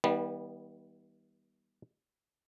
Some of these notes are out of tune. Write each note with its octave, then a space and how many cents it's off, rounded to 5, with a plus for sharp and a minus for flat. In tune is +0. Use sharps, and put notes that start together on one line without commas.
D#3 +40 G3 +0 B3 -20